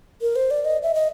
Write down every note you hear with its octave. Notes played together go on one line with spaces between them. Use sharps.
A#4
C5
D5
D#5
E5
D#5